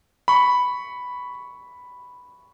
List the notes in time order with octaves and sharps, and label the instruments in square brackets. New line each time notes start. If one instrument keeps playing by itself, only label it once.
[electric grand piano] B5 C#6